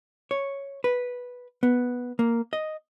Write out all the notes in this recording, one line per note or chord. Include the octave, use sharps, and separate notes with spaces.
C#5
B4
B3
A#3
D#5